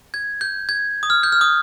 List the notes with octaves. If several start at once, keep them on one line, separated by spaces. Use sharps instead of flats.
G#6
G6
G#6
D#6
F6
G6
F6
D#6